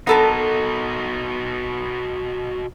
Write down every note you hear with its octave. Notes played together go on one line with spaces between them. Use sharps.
B2 B3 D#4 A4 A#4